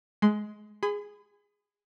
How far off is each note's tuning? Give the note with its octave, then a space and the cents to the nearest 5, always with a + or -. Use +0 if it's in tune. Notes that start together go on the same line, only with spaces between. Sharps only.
G#3 +20 C6 -15
G#4 -10 B5 +40